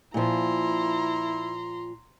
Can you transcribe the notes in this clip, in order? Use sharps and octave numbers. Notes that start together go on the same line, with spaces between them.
A#2 F3 E4 A#5 C6